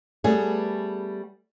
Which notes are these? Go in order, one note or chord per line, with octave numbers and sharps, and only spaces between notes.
G3 A3 B3 G#4